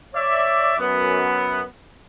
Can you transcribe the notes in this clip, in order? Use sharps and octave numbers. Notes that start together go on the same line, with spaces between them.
C#5 D5 E5
F#2 B3